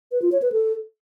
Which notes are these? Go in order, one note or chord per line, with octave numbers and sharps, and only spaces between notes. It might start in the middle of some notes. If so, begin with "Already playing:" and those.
B4
F4
C#5
B4
A4